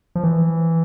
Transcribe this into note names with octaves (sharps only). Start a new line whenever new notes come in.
F3
E3